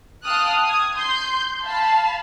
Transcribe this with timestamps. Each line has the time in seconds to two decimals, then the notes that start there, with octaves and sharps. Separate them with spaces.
0.24 F5 G5 A5 D#6 F6 F#6
0.65 D#6 G#6
0.97 C6 G6
1.65 F5 A5 B5